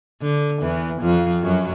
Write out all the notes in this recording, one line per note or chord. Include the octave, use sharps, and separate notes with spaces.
D3
E2 E3
F2 F3
F#2 F#3